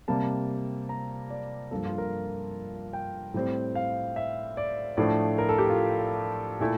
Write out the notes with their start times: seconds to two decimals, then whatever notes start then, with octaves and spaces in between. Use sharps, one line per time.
0.08 C3 G3 A#3 A5
0.89 A#5
1.30 D5
1.71 G2 F3 A#3 A4
1.86 F4
1.98 A#4
2.93 G5
3.34 A2 G3 C4
3.75 F5
4.16 E5
4.57 D5
4.97 A2 F3 A3 D4 D5
5.38 A#4
5.49 A4
5.58 G4
5.70 F4
6.60 A#2 A3 E4